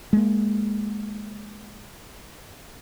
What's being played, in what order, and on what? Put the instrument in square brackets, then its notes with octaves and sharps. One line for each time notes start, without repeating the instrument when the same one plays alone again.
[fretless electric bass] G#3 A#3